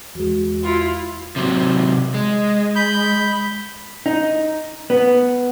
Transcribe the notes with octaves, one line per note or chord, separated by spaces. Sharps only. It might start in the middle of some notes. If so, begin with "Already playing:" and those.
E2 G#3 F#4
E4 F4
C3 F#3
G#3
B5 G6
D#4
B3